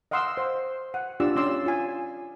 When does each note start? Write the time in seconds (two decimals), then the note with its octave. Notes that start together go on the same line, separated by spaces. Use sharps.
0.11 D#5 F5 F#5 C6 D6 E6
0.37 C5
0.94 F#5
1.20 D4 F4 G4 D5 E6
1.36 C#4 D5 C6 E6
1.66 F4 G#5